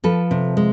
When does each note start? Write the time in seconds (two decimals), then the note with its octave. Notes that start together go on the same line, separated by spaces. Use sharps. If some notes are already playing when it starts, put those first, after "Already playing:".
0.04 F3 A4 B4
0.31 C3
0.57 G#3